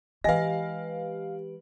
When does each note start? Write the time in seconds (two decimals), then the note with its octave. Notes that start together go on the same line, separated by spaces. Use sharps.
0.24 E3 G#3 G4 B4 D#5 F5 G#5 A#6